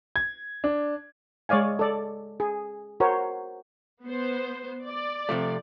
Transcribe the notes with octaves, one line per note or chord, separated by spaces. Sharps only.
G#6
D4
G#3 C#5 D5 F5 G#5
A4 D5
G#4
F#4 A#4 C5 C#5
B3 C5
D5
C3 F3 A3